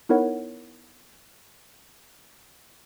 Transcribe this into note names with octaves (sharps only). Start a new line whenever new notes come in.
B3 D#4 E4 A#4 C#5 F#5